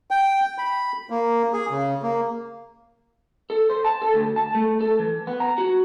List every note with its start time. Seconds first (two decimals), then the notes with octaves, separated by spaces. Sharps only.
0.11 G5
0.58 B5
1.10 A#3
1.53 G#4
1.71 C#3
2.03 A#3
3.50 A4
3.70 C5
3.85 A5
4.02 A4
4.14 D2
4.36 A5
4.55 A3
4.81 A4
4.99 E3
5.27 B3
5.40 A#5
5.58 F#4